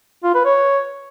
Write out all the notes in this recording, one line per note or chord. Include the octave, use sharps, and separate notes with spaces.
F4
B4
C#5